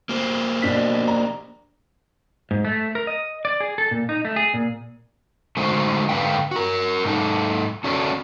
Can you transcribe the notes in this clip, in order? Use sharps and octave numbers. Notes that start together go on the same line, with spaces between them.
A#3 G4 C5
B2 D4 B6
D4 D5 A#5
G#2
A3
A#4
D#5
D5
G#4
A4
A#2
D#4
A3
G#4
A#2
D3 G#3 A3 D#4 F#4 C5
G#2 D3 D4 B4 F5 G5
F#4 A#4
G#2 D#4 A4
C#4 D4 F#4 A4 C#5